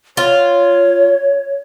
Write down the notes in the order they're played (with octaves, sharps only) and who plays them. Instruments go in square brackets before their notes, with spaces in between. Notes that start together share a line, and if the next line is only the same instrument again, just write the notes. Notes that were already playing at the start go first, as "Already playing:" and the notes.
[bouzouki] F4 [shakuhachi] C#5